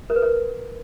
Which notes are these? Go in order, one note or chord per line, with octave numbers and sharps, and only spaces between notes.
A#4
B4
A#4